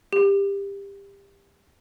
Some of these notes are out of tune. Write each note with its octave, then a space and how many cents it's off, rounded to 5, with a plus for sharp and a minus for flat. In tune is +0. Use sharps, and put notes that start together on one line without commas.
G4 +25